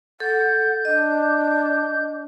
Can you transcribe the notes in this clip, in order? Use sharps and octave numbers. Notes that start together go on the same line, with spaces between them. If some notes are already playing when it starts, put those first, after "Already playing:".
A4 F#5 G6
D4 D#5